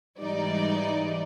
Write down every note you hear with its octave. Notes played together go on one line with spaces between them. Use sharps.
G#2 E3 G3 D#4 D5